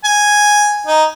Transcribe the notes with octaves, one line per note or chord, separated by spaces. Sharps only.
G#5
D#4